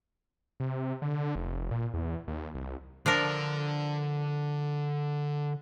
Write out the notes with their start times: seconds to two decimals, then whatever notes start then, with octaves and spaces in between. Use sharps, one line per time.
0.60 C3
1.02 D3
1.35 F1
1.71 A#2
1.94 E2
2.28 D#2
2.55 C2
3.06 D3 F3 D4 A#4 D5